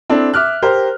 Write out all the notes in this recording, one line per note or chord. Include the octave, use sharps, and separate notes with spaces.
C4 D4 E4 A4
E5 D6 F6 F#6
G4 A#4 C5 A#5